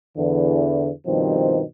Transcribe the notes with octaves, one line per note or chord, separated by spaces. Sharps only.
E2 D3 E3
G2 B2 D#3 F3 G3 C4